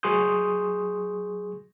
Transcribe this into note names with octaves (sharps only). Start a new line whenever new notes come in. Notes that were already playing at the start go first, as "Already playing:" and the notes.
F#3 G#4 C6 C#6 D#6 G6